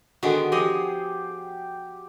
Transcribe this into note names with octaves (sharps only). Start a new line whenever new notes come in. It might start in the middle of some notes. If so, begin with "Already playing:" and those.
D3 D#3 G#3 B3 F#4
F3 G4 G#4 D#5